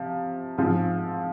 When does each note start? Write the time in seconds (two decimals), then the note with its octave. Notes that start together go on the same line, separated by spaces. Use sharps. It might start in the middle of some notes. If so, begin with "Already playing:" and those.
Already playing: C3 F3
0.58 G#2 F3 C4 F4 G#4